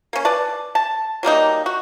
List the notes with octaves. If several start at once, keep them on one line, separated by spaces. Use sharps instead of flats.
A#3 C#4
B4 D5 A5
A5
F#3 G3 A#3 D#4
F#4